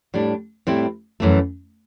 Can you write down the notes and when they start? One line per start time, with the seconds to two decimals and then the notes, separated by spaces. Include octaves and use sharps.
0.14 A2 G3 D4
0.67 A2 G3 C4 E4
1.20 F#2 E3 A3